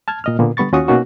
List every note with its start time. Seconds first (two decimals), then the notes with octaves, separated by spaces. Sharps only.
0.08 A5 F6 G#6
0.24 A#2 D#5 F6
0.39 A#2 D3 A#3 B3
0.57 D3 G3 B3 B5 C#6 A6
0.72 D#2 C#4 F4 F#4 C#6 D#6
0.88 B2 A#3 C#4 D#4 F#4